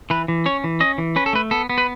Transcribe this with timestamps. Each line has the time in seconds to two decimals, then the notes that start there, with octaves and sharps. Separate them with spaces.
0.10 E3 B4
0.28 E3
0.46 C#4 C#5
0.64 E3
0.80 C#4 D#5
0.98 E3
1.16 C#4 B4
1.26 A4
1.33 A3 B4
1.51 B3 A4
1.70 B3
1.78 B4